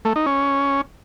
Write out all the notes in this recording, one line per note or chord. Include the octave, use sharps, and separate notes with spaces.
A3
D#4
C#4